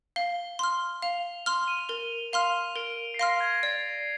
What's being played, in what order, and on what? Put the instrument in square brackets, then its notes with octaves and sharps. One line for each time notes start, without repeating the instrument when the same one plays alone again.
[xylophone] F5 [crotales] G7
[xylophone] C6 F6
[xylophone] F5 [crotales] F7
[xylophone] C6 F6
[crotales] D#7
F7
[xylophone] A#4 [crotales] G7
[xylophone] F5 C6 F6 [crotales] F7
[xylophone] A#4 [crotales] D7
[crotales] C7
[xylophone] F5 C6 F6 [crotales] A#6
[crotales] G#6
[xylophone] D5 [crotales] C7